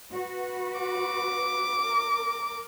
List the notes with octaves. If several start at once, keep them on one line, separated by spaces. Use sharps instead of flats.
F#4 B4
D6
A#4